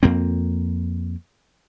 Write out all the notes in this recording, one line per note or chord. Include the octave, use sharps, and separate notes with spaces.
F2 A#3 C4